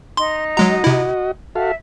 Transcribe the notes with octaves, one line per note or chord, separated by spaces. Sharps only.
D#4 C6
F#3 G#3 F#4 D#5 A#5
C3 E4
F#4 A4 E5 F5